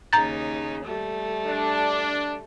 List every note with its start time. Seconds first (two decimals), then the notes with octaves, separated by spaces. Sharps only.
0.13 D#2 C#3 D#4 A#5 G6 A6
0.85 G3 A3
1.46 D4